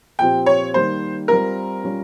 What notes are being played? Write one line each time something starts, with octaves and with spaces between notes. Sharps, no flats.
A#2 F3 C4 G4 G5
C#5
D#3 G3 A#3 C5
G3 C4 F4 A#4
G3 C#4 F4